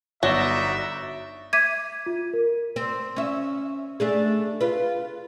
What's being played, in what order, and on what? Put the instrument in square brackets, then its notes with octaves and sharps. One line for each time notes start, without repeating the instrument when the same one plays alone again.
[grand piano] G1 E7 G7 [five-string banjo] F#3 [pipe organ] D#4 F#4 D5 [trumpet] E5
[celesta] E5 D6 B6 [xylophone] G#6 D#7
[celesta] F4
A#4
[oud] C4
C#4 E5
A3 D4 G#4
F4 B4